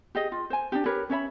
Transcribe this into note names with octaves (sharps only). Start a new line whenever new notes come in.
G4 G#4 D#5
F4
C5 G#5
D4 D#4 G4
G4 A#4 B4 C#5
C#4 C#5 E5 B5